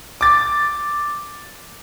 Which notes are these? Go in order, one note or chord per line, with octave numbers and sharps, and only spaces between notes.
D6 A6